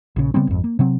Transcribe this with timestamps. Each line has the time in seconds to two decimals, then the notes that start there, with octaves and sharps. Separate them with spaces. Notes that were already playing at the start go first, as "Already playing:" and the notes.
0.16 A#1 C#3
0.34 C#3 G3 B3 C4
0.47 G#1 F2
0.64 A#3
0.79 C3 F#3 C4